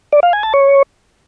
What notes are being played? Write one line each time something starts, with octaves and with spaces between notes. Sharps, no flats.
D5
F5
G#5
A5
C#5